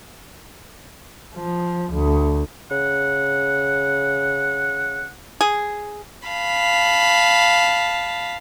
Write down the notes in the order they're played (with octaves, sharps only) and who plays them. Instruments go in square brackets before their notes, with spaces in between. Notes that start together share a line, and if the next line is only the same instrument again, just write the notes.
[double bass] F3
D2
[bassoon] C#3 [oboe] F#5
[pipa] G#4
[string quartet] F5 A5 B5